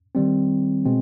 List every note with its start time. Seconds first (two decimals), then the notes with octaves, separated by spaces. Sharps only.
0.15 D#3 G3 C4
0.86 B2 G#3 C4